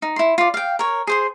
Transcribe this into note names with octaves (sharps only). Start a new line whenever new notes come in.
D#4
E4 C6
F4 D5
F5 G5
A#4 C#5
G#4 C5 C6